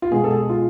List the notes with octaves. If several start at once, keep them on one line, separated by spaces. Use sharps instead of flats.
F4
B2 G#3 G#4
A4
G#4
F4